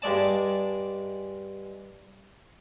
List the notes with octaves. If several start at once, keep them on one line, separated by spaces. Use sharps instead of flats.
G2 G#3 D5 A5